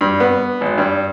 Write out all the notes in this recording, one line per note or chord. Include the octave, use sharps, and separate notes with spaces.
G2
B3
G#1
G2